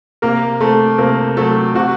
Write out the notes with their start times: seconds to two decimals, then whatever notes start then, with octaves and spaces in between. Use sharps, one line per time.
0.22 C3 A#3 A#4
0.60 A3 C4 A4
0.98 C3 A#3 A#4
1.37 F#3 A3 A4
1.75 C3 F#4